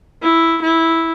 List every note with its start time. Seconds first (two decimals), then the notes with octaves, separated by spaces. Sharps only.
0.22 E4
0.62 E4